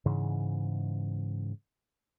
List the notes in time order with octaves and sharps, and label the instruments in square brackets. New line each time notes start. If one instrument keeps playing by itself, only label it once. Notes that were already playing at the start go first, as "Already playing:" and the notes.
[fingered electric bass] G#2 C#3 E3